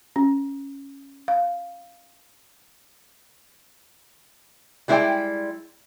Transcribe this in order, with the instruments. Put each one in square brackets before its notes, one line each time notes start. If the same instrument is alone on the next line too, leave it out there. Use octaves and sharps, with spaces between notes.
[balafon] C#4
F5
[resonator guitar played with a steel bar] G3 G#3 E4 B4 D5 G5